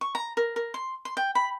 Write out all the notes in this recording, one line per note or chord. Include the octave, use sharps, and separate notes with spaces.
C#6
A#5
A#4
A#4
C6
C6
G5
B5